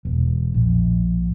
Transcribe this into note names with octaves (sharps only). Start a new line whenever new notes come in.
E1
A#1